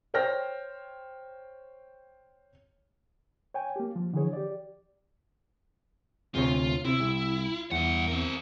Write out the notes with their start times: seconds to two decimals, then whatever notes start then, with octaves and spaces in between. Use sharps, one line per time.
0.14 C5 C#5 G5 F6 A#6
3.54 C#5 G5 G#5
3.76 A#3 G4
3.96 F3
4.13 D3 E3 F3 G#4 C#5
4.33 G4 D5
6.35 D2 C3 F4 C#5
6.85 C3 E4
7.00 C2
7.71 E2 G2 F#5
8.08 C4 A#4